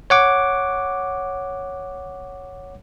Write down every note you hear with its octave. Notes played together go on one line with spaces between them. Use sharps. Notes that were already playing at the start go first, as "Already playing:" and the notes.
C#5 F#5 D6